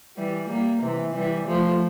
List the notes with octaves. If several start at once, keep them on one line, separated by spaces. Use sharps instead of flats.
E3 G3
G3 A#3
C3 E3
E3 G3
F3 A3